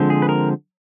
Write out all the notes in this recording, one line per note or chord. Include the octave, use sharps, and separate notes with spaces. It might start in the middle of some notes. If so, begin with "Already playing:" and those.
Already playing: D3 F3 G#3 C4
G#4
B4
A#4